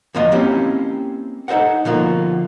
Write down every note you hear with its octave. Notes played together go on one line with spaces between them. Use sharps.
E2 B2 D3 F3 F4 D#5
A#3 C4 C#4 E4 G4
D#4 A4 C5 D#5 F#5
B2 D3 F3 A#3